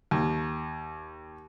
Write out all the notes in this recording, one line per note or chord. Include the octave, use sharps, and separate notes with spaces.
D#2